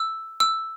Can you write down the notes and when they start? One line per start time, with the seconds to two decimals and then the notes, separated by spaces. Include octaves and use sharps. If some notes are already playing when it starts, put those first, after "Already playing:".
Already playing: E6
0.40 E6